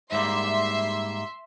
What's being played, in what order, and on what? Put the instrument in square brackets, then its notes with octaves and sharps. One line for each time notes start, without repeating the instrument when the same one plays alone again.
[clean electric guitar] G#2 G3 A#3 [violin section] E5 C6